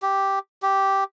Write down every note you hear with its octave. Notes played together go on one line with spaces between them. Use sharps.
G4
G4